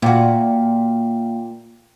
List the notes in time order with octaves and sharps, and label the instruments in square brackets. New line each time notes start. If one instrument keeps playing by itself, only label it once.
[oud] A#2 F#4 [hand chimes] A#3 F5 G5